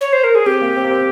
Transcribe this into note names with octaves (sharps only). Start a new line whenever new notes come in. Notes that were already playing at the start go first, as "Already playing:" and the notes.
C#5
C5
A#4
G#4
C4 G4
A#3
C4
A#3
C4